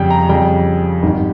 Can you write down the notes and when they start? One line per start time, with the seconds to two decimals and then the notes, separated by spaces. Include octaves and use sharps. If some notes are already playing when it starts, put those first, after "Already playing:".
Already playing: F2 C#3 G3 G5
0.10 A#5
0.28 F2 C#3 G3 G5
1.02 G#1 G2 D#3 G3